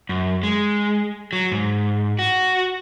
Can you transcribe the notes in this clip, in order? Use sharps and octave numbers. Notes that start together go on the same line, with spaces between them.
F#2
G#3
F#3
G#2
F#4